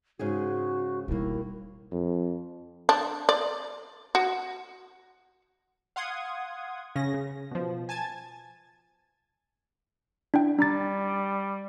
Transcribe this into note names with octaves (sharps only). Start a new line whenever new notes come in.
G#2 C#3 F#4 G#4
D#2 B2 G3 A#3 E4
F2
D4
D5
F#4
F5 F#5 C6 D#6 G#6
C#3 C#4 A#6
C#3
B2 F3
G#5 A5 G#6 A6
D4 E4 G5
G3 D4 A#5 A6